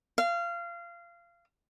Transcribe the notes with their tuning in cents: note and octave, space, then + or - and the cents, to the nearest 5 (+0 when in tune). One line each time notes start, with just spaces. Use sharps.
F5 -25